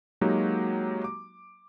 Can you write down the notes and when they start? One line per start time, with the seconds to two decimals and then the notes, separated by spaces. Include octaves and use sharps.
0.21 F#3 G#3 A#3 D#4 F#4 G4
1.04 D6